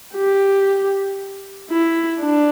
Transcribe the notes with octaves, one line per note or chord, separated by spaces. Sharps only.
G4
E4
D4